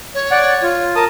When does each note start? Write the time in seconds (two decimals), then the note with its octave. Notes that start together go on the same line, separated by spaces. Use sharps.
0.14 C#5
0.31 D5 F#5
0.63 F4
0.96 A#4 A5 D#6